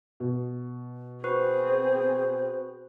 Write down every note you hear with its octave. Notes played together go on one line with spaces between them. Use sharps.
B2
C4 F#4 G#4 B4 C5